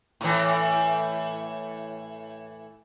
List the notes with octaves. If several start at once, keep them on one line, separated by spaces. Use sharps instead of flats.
A2 E3